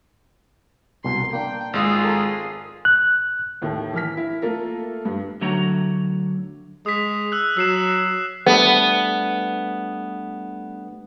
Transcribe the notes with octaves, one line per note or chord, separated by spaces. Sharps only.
C2 B2 C6
A#3 D4 G5
G#1 G#3 F4 G#4 D#6
A4 A#4
F#6
D#2 A2 D#3
E3 A#4 F6 B6
E4
A3 A#3 F4 A4 A#4
G2
D3 F#3 A3 F#4 F#5 A#5
G#3 D#6 B6
E6 F#6
F#3 E6 C7 E7
G3 A3 B3 D4